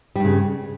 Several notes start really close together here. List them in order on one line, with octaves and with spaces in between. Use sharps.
G3 G2 C#3